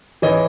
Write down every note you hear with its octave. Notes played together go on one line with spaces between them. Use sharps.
E3 C#5 D#5